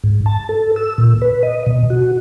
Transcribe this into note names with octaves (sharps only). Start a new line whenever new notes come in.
G#2
A5
A4
E6
A#2
B4
D#5
B2
F#4